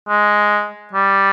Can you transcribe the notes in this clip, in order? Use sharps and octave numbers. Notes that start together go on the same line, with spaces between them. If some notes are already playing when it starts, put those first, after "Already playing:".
G#3
G3